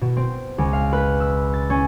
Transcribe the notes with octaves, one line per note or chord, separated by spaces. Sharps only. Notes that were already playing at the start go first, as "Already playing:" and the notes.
B2
C4
C#2
F5
B4
E6
A6
C#4